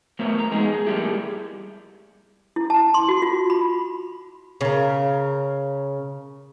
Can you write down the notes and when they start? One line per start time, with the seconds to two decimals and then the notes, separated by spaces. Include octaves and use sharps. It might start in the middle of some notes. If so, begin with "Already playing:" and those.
0.19 F#3 A3 B3 A#4 C5 E5
0.39 A#5
0.51 G#3 B3 D#4 G#4
0.74 G#4
0.86 G3 A3 A#3 E4 G4 G#4
2.56 E4
2.70 A5
2.94 C6
3.08 F#4
3.22 F4
3.50 B5
4.61 C#3 A#4